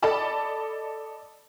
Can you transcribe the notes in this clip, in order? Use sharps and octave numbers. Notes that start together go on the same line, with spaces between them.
A4 D5 D#5 A5 B5